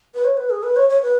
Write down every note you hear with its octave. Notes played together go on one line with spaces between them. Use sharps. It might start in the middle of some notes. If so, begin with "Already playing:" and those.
B4
C#5
B4
G#4
B4
C#5
C#5
B4